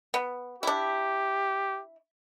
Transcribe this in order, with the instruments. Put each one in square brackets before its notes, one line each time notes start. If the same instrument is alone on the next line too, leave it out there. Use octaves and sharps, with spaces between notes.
[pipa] B3
[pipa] D4 E4 [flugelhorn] G4